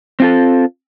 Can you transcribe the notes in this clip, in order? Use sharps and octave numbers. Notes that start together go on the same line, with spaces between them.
C4 F4 A4